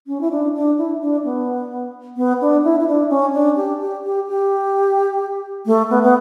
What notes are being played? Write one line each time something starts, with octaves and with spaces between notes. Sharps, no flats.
C#4
E4
D4
D4
E4
D4
B3
B3
D4
E4
E4
D4
C#4
D4
G4
G4
G4
G4
A3
B3
B3